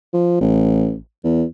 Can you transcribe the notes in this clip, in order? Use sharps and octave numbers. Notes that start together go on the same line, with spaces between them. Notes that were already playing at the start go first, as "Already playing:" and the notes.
F3
A1
E2